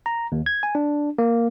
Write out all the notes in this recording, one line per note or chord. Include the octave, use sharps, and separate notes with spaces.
A#5
D#2
G#6
G#5
D4
A#3